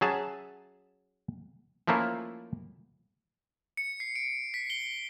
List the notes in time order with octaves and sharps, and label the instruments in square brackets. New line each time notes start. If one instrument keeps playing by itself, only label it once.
[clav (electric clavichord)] F#3 C#4 G#4 E5 A5
F3 A3 A#3 C#4 E4 F4
[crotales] C#7
C7
D7
B6
G7